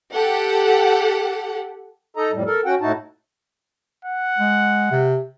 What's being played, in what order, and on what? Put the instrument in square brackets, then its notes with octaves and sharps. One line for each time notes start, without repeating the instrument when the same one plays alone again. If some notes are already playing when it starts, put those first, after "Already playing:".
[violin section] G4 A4 F#5
[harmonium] D#4 A4 D#5 A#5
F2 A2 G3
A4 A#4
C#4 F#4 F#5 G5
A2 D#4 E4 F#4 A5
[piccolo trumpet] F#5
[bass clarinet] G#3
C3